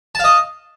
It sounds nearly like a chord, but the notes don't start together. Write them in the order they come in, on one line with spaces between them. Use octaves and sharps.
A5 F5 D#5